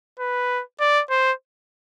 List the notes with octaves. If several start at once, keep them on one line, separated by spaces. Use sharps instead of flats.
B4
D5
C5